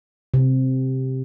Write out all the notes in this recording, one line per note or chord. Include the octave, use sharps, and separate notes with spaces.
C3